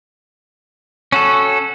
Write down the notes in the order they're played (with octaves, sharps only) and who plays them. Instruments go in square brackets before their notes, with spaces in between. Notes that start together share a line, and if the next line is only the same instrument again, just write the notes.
[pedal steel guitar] C#4 F#4 A4